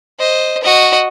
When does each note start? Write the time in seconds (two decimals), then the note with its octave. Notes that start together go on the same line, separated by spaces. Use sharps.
0.19 C5 D#5
0.63 F#4 D#5